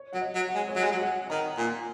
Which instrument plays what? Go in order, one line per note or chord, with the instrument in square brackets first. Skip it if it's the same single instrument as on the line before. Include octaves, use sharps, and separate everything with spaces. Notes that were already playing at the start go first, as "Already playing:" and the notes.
Already playing: [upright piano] C#5
[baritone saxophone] F#3 [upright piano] F#5
[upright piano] D#5
[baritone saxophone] F#3
[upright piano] F#5
[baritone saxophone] G#3
[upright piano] C#5
[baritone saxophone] F#3 [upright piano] D#5
[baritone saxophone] G#3
F#3
[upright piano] F#5
[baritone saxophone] D#3 [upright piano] A#5
[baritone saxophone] A#2 [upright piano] G#5